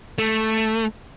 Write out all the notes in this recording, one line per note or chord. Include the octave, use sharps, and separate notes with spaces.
A3